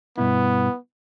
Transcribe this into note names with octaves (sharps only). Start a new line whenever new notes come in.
G2 B2 B3 E4